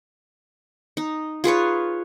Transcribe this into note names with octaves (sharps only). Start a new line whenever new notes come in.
D#4
F4 G#4 B4 C#5